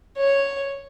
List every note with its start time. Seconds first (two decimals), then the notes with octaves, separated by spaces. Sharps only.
0.17 C#5